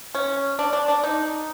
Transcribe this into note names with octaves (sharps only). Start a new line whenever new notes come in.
C#4
D4
D4
D4
D#4